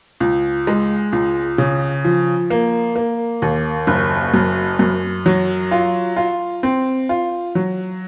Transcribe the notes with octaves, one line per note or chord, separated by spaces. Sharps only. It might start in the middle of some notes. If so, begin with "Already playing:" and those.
C#2
G#3
C#2
C#3
F3
A#3
A#3
D#2
F#1
F#2
F#2
F#3
F4
F4
C4
F4
F#3